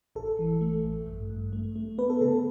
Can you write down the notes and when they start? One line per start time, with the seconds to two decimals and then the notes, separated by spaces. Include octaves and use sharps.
0.15 A1 A4
0.39 E3
0.61 A3
0.85 A1
1.07 G2
1.30 G2
1.53 A3
1.76 A3
1.98 B3 B4
2.10 A4
2.21 C#3 A4